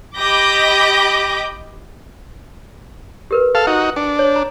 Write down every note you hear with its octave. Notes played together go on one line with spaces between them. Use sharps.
G4 D#5 B5 D6 G6 A#6
G4 A#4 B4
A4 F5
D#4 F#4
D4 G5
C#5
A#5